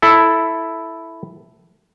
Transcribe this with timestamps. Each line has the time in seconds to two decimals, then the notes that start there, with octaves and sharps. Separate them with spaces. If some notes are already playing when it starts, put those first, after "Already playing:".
0.02 E4 A4